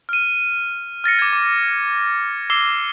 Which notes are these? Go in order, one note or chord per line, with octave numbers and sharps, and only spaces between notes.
F6 D#7
F6 A6 A#6 C#7
D6 G#6
D6
D6 E6 C7 G7